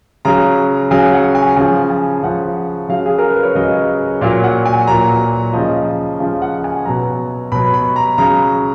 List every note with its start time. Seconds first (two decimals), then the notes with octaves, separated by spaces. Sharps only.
0.25 C#3 F#3 A#5
0.91 C#3 F#3 G#5
1.13 F#5
1.35 G#5
1.56 C#3 F3 G#5
1.90 G#5
2.23 C#3 F3 F#5
2.89 C#3 F#3 F5
3.06 G#4
3.18 A#4
3.30 B4
3.43 C#5
3.55 C#3 F#3 D#5
4.21 A#2 F#3 F5
4.44 F#5
4.66 G#5
4.87 A#2 F#3 A#5
5.53 C#3 F3 D#5
6.20 C#3 F3 F5
6.42 F#5
6.64 G#5
6.86 B2 F#3 A#5
7.52 B2 F#3 B5
7.74 B5
7.96 A#5
8.18 C#3 F#3 A#5